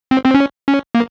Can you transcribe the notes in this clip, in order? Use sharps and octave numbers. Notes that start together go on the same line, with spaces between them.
C4
C4
C#4
C#4
A#3